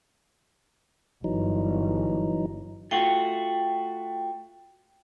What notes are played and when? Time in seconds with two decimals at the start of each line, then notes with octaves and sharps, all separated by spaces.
1.24 G1 E3 F#3 D#4
2.91 A3 F4 F#4 G5